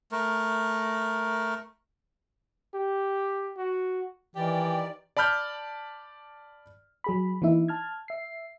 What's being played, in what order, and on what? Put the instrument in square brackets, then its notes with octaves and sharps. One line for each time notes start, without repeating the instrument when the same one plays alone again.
[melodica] A3 A#4
[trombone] G4
F#4
[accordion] D#3 D5 [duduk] E3 [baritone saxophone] G4
[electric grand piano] D5 A5 B5 F6 G6
[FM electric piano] F#3 G#4 B5
E3 A#3 D#4 E4 E5
A5 F6 G#6
E5 C7